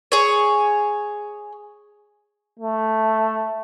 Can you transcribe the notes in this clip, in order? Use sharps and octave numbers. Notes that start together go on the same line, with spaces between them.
G#4 C#5
A3